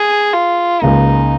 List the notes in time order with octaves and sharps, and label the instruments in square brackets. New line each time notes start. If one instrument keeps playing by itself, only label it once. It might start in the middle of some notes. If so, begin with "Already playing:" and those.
Already playing: [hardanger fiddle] G#4
F4
[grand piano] C#2 C#3 A#3 [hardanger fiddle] D#4